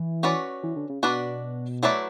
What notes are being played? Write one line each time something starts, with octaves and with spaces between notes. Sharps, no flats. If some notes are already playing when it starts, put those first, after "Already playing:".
Already playing: E3
C#4 F#4 B4 D5
E3
D3
C#3
B2 D4 F#4 B4 D5
F#3 A3 E4 B4 D5